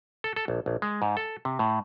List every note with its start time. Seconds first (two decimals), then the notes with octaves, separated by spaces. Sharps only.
0.24 A4
0.36 A4
0.48 A#1
0.66 A#1
0.82 G#3
1.02 G#2
1.17 A4
1.45 C3
1.59 A2